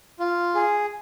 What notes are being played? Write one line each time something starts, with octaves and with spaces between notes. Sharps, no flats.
F4
G#4